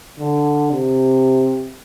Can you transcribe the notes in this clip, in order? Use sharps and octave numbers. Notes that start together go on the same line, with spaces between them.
D3
C3